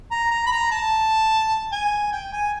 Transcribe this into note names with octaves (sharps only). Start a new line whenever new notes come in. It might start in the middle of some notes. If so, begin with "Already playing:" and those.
A#5
A#5
B5
A#5
A5
G#5
G5
G#5